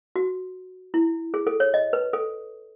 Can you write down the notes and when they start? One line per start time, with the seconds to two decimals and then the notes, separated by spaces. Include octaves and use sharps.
0.16 F#4
0.94 E4
1.34 G#4
1.47 A4
1.60 C#5
1.74 D#5
1.93 B4
2.13 A4